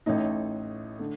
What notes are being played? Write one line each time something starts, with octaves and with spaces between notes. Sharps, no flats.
A1 A2 A3 D#4
D3 A3